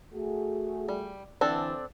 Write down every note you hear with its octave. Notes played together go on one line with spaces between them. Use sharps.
A3 F#4 G#4
G3
D3 E3 C4 D4 A4